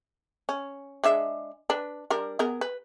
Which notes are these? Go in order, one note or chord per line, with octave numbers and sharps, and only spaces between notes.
C#4
G#3 D4 E5
D4 B4
G3 D4 A#4
B3 G#4 A#4
B4